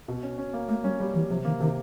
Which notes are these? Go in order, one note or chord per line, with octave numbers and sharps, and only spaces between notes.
B2
C#4
C#4
A#3
A3 A#3
G3 C#4
G3
E3 G3
C3 F3
D#3 A#3
C3 D#3